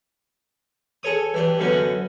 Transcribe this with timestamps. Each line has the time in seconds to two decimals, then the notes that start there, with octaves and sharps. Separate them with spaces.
1.03 G#4 A4 C#5 D#6
1.34 E3 D4 G4
1.59 F#2 D3 B3 C#4 F#4